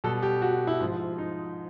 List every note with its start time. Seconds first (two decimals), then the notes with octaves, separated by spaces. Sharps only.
0.04 B2 G3 A4
0.23 G4
0.42 F#4
0.67 E4
0.81 G#2 F3
1.18 D#4